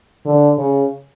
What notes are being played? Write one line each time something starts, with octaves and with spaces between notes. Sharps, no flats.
D3
C#3